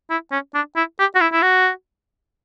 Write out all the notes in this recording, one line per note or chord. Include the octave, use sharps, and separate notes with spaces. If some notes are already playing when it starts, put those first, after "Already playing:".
E4
C#4
D4
E4
G4
F#4
E4
E4
F#4